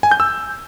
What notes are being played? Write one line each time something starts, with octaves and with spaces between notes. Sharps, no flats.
G#5
G6
E6